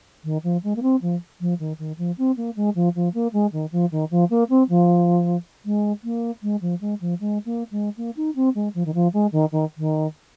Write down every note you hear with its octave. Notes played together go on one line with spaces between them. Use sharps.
D#3
F3
G#3
A#3
C4
F3
F3
D#3
D#3
F3
C4
A#3
G#3
F3
F3
A#3
G#3
D#3
F3
D#3
F3
A#3
C4
F3
G#3
A#3
G#3
F3
G#3
F3
G#3
A#3
G#3
A#3
D#4
C4
G#3
F3
D#3
F3
G#3
D#3
D#3
D#3